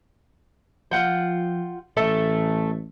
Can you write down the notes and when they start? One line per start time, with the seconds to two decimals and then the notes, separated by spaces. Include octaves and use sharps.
0.91 F3 F4 F#5 G5
1.97 A1 A3 A4 E5